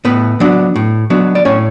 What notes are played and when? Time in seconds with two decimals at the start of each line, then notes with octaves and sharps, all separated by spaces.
0.05 A2 B3 B4
0.40 F#3 B3 D4
0.76 A2
1.10 F#3 B3 D4
1.35 D5
1.45 A2 C#4 C#5